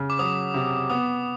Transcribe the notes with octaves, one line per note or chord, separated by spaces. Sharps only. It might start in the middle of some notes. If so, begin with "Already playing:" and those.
Already playing: C#3
D6
F#3 D#6
C3
B3 D#6